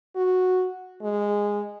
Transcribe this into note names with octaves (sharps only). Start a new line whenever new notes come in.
F#4
G#3